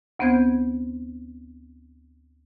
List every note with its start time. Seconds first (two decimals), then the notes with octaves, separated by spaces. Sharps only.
0.19 D2 B3 C4 C5 G6 G#6